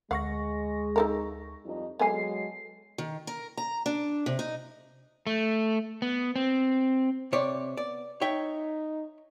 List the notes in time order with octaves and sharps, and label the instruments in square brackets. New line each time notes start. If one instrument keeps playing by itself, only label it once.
[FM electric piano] D2 C#6 A#6 [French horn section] G#3 [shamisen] F5 F#5
[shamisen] D#4 A4 A#4
[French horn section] F2 G3 D#4
[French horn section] F#3 G#3 [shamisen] B3 G#4 G#5 [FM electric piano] A4 C7
[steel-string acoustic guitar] D#3
A#4
A#5
D4
C3
D#4
[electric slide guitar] A3
B3
C4
[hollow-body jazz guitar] C3 C#5 D5
[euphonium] B3 [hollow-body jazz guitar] D5
[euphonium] D#4 [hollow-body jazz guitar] C#5 E5 G5